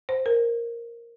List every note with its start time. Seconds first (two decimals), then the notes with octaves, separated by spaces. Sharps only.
0.09 C5
0.26 A#4